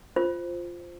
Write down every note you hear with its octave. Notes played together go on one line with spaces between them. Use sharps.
F4 C5